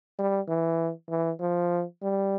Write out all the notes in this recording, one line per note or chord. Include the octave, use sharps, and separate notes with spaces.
G3
E3
E3
F3
G3